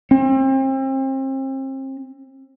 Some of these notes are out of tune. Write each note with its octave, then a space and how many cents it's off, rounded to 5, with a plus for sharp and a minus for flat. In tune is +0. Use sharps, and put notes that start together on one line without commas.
C4 +35